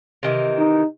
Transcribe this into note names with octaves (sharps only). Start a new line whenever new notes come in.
C3 D#3 E3
D#4